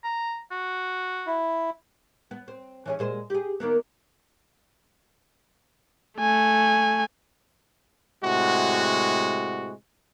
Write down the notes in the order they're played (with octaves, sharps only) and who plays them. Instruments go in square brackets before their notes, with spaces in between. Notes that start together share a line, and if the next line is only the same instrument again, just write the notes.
[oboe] A#5
F#4
[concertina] E4
[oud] B3
C4
E3 C#4 G#4
A#2 G#3 C5
G4 G#4
D#3 A#3 B3
[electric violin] A3 G#5
[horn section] A2 C3 G#3 F#4